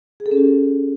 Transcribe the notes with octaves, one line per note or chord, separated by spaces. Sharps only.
G#4
A4
C#4
G4